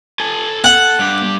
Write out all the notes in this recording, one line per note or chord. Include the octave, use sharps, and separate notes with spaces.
A4 G#5
F#5
G2 G4